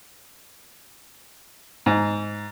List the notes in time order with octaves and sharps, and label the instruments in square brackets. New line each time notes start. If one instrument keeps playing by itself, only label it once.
[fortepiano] G#2